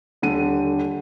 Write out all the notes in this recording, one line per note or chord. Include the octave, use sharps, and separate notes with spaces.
D#1 D3 D#7